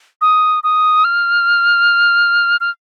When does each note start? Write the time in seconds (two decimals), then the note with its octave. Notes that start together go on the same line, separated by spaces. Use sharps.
0.21 D#6
0.64 D#6
1.04 F6
2.61 F6